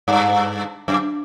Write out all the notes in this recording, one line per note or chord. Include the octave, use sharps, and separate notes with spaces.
G2
F#2